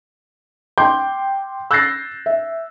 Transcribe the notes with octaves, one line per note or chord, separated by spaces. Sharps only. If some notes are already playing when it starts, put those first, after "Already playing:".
G5 C6 D6 G6
E6 F#6 G6 A6 A#6 C7
E5